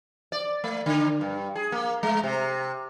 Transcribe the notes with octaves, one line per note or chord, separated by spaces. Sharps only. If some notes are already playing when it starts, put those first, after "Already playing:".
D5
A3
D3
G2
G#4
A#3
G#3
C3